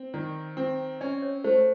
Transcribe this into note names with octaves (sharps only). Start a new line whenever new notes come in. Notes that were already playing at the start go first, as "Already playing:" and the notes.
Already playing: C4
D#3 D5
C4
C#4 D5
C#5
A3 C5